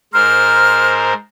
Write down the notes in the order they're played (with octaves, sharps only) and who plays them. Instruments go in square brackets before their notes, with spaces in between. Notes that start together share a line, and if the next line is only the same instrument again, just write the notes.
[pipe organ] G#2 A#4 C5 [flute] F6